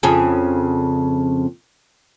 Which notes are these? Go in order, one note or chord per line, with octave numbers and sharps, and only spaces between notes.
F2 C#3 G#4